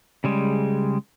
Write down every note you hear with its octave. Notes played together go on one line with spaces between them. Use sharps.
C#3 G3 G#3